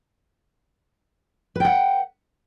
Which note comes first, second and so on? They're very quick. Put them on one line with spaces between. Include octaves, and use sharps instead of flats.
B4 G5 F#5